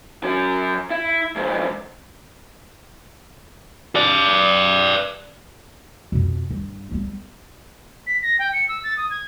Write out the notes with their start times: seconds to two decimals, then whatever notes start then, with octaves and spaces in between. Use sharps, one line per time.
0.24 F#3 C#4
0.91 E4
1.36 F2 G#2
3.96 B4 D5
6.12 F2 B2
6.50 G2
6.91 G3 B3
8.07 B6
8.22 A#6
8.39 G5
8.53 C#7
8.69 E6
8.84 A6
8.97 D#6
9.10 G#6